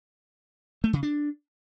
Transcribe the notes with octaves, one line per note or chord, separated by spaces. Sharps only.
A3
C#3
D4